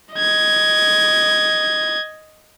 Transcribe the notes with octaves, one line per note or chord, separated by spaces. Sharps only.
D#5 G#6